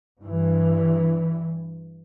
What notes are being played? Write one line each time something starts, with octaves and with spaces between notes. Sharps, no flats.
G2 E3